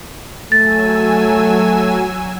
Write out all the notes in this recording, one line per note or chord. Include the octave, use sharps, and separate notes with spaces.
F#3 A3 G#5 E6 A6